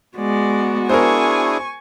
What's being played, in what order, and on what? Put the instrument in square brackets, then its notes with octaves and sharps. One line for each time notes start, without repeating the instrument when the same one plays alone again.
[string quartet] G#3 D5 [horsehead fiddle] B3 F#4
[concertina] D4 E4 G#4 [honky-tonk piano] A#4 C5 [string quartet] G#5 C#6